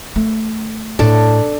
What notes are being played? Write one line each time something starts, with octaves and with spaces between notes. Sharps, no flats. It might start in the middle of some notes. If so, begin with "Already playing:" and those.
A3
A2 D4 A4